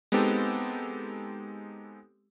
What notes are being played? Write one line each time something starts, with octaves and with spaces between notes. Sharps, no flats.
G#3 B3 C4 D#4 G4 A4